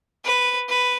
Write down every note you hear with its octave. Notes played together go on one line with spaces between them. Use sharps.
B4
B4